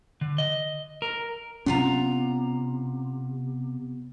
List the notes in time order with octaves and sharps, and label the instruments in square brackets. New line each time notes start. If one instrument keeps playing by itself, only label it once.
[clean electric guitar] D3
D#5
A#4
[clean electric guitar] C3 [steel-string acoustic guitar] B3 F4 A#5 [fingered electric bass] C#4